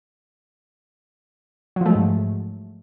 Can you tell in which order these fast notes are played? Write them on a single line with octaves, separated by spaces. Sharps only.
F#3 F3 A3 G#3 G#2